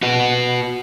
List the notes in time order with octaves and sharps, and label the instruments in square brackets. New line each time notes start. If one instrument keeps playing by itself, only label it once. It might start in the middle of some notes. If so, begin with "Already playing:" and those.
[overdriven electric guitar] F#4 B4